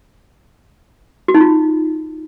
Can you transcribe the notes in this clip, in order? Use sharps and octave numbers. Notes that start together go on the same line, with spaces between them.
F#4
D#4
F4